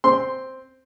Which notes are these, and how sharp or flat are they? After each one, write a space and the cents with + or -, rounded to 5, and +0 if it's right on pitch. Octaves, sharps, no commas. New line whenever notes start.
C4 +0 C6 +0